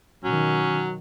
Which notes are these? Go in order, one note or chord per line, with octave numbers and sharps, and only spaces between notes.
B2 D#3 F#3 C#4